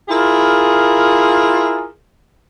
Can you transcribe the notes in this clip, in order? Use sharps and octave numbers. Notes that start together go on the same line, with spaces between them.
E4 F4 G#4 A#4